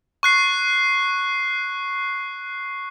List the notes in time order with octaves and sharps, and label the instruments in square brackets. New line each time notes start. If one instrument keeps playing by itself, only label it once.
[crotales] C#6 F#6 C7